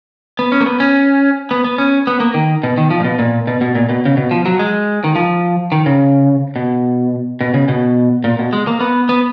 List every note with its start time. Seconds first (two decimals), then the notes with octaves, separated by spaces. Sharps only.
0.39 B3
0.52 C#4
0.61 A#3
0.66 B3
0.80 C#4
1.51 B3
1.64 B3
1.78 C#4
2.07 B3
2.20 A#3
2.34 D#3
2.63 B2
2.78 D#3
2.90 F3
3.00 A#2
3.05 B2
3.19 A#2
3.47 B2
3.61 B2
3.75 A#2
3.89 B2
4.05 C#3
4.17 B2
4.31 F3
4.46 F#3
4.59 G#3
5.04 D#3
5.16 F3
5.72 D#3
5.86 C#3
6.56 B2
7.41 B2
7.54 C#3
7.68 B2
8.24 A#2
8.39 B2
8.53 G#3
8.67 A#3
8.81 B3
9.09 B3